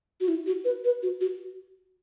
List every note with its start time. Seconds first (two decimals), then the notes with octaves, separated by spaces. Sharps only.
0.21 F#4
0.28 E4
0.46 F#4
0.65 B4
0.84 B4
1.03 F#4
1.21 F#4